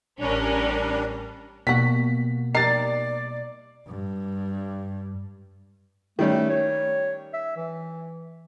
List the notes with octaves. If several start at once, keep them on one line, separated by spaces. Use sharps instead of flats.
A1 G3 C#4 D4 A#4
B2 G3 A#3 F#4 B6
G3 D#4 A#4 D5 A6 C7
G2
D#3 G3 A3 C#4
C#5
E5
E3